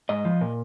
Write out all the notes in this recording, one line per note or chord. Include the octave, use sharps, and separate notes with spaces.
G#2 D#5
F3
A#2